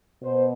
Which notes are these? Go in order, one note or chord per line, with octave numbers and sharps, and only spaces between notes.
B2 C5